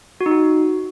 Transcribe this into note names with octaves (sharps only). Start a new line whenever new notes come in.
F#4
D#4
F#4